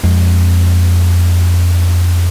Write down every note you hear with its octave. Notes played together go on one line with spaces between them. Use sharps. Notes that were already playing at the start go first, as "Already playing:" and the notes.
F2 G#3